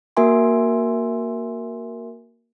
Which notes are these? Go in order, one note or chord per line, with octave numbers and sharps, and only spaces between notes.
A#3 F#4 A#4 E5 G#5 C6